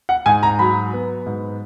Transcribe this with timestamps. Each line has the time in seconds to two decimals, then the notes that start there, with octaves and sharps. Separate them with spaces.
0.09 F#5
0.26 G#2 G#5
0.43 A#5
0.59 F#3 B5
0.93 B3
1.26 G#2